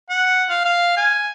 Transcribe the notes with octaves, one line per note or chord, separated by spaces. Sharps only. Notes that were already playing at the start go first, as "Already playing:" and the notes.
F#5
F5
F5
G#5